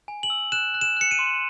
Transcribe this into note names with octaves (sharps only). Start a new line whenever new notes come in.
G#5
F#7
E6
F#6 E7
F#6
E7
F#6 C#7
D#7
C6